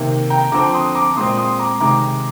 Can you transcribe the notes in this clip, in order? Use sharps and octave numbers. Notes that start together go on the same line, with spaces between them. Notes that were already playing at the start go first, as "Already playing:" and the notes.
Already playing: C3 D#3 A#3
G5 A#5
D3 F3 C4 A#5 D6
C6 D#6
A#5 D6
A#2 G#3 C4 C6 D#6
C6 D#6
A#5 D6
C3 D#3 G#3 A#5 D6